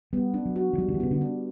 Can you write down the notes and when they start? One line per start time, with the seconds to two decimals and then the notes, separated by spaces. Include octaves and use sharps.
0.13 G3 B3
0.34 D4
0.46 F#3
0.56 F#4
0.73 E3
0.78 F#3 G3
0.88 D3
0.94 E3
1.00 C#3 B3
1.11 D3
1.21 D4